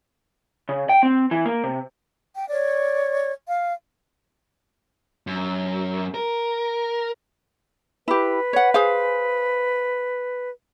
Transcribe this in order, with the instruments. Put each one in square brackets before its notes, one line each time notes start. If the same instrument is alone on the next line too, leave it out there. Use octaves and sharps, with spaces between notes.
[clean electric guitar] C#3
G5
C4
E3
A#3
C3
[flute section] G5
C#5 D5
F5
[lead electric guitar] F#2
A#4
[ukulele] E4 G4 [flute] B4
[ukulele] C#5 F#5
G#4 C5 F5